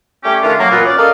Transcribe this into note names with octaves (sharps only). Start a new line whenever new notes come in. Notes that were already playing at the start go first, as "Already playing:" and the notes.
G3 A3 C#4 G4
D#3 A3 C#4 D4 F4
F#3 A#3
F#2 A#2 E3 B3 F4
C#4 D5
A4 A#4 D5 D#5 F5